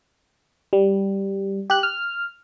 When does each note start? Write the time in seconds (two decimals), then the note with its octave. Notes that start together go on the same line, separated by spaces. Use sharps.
0.73 G3
1.70 G4 F#6
1.83 F6